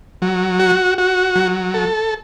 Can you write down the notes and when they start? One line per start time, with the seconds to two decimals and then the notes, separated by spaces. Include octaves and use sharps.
0.22 F#3
0.60 F#4
0.98 F#4
1.36 F#3
1.74 A4